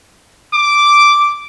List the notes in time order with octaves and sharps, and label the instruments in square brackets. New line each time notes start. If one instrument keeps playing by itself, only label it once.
[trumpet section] D6